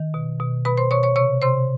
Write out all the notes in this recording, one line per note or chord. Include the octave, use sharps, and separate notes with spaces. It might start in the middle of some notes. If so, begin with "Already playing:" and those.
Already playing: D#3
B2
B2
B2 B4 B5
C5 C6
B2 C#5 C#6
C#5 C#6
C3 C#5 C#6
C3 C5 C6